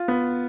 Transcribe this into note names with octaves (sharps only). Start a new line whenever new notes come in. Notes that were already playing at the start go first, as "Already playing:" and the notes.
Already playing: F4
B3